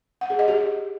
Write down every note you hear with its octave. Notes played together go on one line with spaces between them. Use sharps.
F#5
G#4
D#5
G4